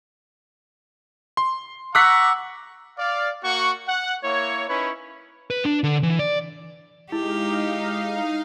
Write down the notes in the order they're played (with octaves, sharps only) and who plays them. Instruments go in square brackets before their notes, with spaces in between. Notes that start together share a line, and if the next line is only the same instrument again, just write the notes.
[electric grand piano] C6
[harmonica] F#5 A#5 C#6 [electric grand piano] D6 F#6 B6 [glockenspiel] E6
[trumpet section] D5 F5
A#3 F#4 F#5 C#6
F#5
A#3 E4 C#5
C#4 D#4 E4 B4 C#5
[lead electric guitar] B4
D4
D3
E3
D5
[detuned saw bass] G#3 [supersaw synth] D#4 F5 [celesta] E4 [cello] G4